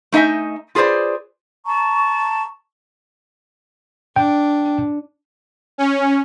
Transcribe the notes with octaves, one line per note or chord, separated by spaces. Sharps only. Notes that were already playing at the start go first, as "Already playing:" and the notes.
A3 D#4 D#5 E5 G#5
F4 G#4 B4 C5 D5
A5 A#5 C#6
D4 G5
C#4